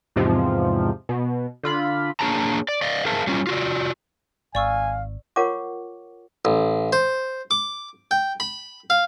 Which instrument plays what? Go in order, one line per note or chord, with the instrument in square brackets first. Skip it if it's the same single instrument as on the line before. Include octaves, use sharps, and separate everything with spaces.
[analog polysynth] E2 G#2 C3 F3
B2
D3 F4 B5
[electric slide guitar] A#3 D4 G#4 C#5 A5 A#5
D5
D5 D#5 F5
G#4 A#4 C5 E5 F5 A5
F#3 G3 C#4 F4
F4 F#4 D5
[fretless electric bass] G#1 [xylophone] D5 C#6 E6 [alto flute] F5 [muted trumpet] G#5
[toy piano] F4 A#4 C#5 F#5 C#6 D6
[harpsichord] A1
C5
D6
G5
B5
F5